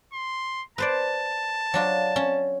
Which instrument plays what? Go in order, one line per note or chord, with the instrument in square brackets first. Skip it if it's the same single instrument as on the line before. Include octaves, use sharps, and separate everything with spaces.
[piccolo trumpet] C6
[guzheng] B4 C5 D5 [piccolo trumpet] A5
[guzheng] F#3 D4 F4
C#4